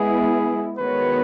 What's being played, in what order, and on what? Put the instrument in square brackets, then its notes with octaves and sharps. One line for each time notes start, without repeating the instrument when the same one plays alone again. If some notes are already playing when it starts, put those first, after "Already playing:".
Already playing: [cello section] G#3 B3 E4 [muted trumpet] G#4
[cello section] D#3 G#3 B3 F#4 C#5 [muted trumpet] B4